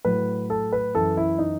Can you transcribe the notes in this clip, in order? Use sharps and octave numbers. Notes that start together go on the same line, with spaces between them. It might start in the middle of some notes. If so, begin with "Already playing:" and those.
A2 F#3 B4
A4
B4
F#2 E3 A4
E4
D#4